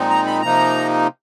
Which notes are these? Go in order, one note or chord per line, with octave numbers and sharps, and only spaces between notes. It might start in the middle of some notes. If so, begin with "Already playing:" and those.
Already playing: A#2 F3 G#3 C4 D#4
A#5
B5
C3 F3 A#3 D#4 A#5